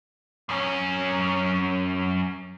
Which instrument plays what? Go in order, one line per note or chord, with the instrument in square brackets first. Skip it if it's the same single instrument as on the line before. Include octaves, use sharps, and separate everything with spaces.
[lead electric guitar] F#2 C#4